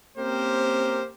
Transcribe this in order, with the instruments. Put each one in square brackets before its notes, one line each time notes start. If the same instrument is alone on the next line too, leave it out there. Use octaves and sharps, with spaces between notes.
[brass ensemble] A#3 C4 C#4 G4 A#4 C5